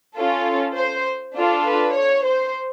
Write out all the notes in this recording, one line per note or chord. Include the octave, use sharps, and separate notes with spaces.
C#4 F4 A4
C5
D4 F4 A4
B4
C#5
C5